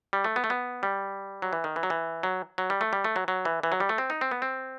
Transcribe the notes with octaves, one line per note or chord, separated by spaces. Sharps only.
G3
A3
B3
A3
B3
G3
F#3
E3
D#3
E3
F#3
E3
F#3
F#3
G3
A3
G3
A3
F#3
F#3
E3
E3
F#3
G3
A3
C4
D#4
C4
B3
C4